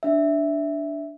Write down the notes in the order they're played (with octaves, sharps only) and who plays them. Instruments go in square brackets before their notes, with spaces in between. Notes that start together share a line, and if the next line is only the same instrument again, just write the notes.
[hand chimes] D4 E5